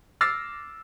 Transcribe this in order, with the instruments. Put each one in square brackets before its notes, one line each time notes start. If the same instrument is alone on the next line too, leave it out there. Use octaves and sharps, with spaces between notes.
[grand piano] D6 E6 F6 A6 A#6 C7